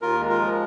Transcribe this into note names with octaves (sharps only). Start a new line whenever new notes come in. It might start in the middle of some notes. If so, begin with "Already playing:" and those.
D#2 F4 A#4
G#3
F4 A#4
F3